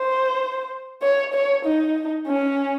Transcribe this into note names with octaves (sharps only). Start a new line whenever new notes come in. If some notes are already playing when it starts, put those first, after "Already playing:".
Already playing: C5
C#5
C#5
D#4
C#4